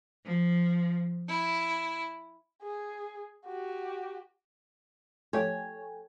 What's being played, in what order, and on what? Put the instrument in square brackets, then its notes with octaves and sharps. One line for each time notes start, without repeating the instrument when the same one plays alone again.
[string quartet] F3
E4
[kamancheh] G#4
F#4 G4
[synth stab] F3 A3 G4 [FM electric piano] A4 G5 G#5 [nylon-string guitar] C#5